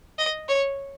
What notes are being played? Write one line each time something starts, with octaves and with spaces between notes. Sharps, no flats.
D#5
C#5